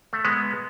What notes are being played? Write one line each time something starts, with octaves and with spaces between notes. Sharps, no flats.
A3
G#3 B3